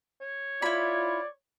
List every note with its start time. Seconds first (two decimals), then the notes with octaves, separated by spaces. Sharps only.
0.21 C#5
0.62 E4 F4 D5 B5